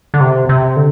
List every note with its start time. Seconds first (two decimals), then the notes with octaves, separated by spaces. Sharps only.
0.14 D3
0.20 C3
0.49 C3
0.76 D3